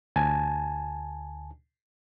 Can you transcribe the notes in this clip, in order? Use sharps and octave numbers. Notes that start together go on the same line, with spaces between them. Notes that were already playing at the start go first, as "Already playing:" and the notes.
D2 G#5 A5